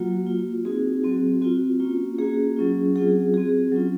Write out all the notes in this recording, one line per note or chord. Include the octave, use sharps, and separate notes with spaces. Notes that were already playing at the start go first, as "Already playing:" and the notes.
Already playing: F#3 A#3 F4 F#4
A#3 F4
C4 D#4 F#4 G#4
F#3 C4 F#4
C4 F4 F#4
A#3 C#4 F4
A#3 C#4 F#4 G#4
F#3 C#4 F4
F#3 C4 F4 G#4
C4 F#4 G#4
F#3 C#4 F4